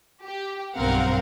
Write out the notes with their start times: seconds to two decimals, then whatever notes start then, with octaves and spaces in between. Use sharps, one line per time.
0.24 G4
0.75 B1 G2 C4 A#4 F5 F#5